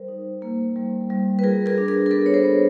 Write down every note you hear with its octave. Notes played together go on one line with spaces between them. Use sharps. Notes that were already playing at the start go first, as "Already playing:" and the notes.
Already playing: G3 A#4 C5
D#4
A#3
G3
G3
B4
F4 G#4 A#4
G#4 A#4
D4
G#4 A#4
A#4
B3 A4 B4
C#5
A#4 C5
B3